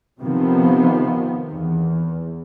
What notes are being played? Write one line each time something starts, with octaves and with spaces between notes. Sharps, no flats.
C3 D#3 F3 B3
E2